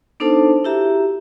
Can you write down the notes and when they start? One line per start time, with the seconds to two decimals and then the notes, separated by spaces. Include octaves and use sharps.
0.20 B3 D4 D#4 A4 C5 A5
0.64 E4 F#4 G4 E5 A#5